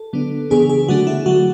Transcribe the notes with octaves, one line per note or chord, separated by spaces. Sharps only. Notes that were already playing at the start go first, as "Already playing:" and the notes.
Already playing: A4
D3 F#3 B3 D4
C#3 E3 B3 D4 G#4
G#4
D3 F#3 A3 D4 F#4
E4
D3 F#3 A3 F#4